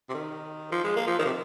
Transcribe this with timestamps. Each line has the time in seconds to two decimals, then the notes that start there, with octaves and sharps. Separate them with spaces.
0.09 C3
0.14 D#3
0.71 F3
0.84 G#3
0.96 A#3
1.07 F3
1.19 D#3
1.25 C3